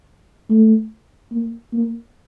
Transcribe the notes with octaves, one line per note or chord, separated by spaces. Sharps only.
A3
A#3
A#3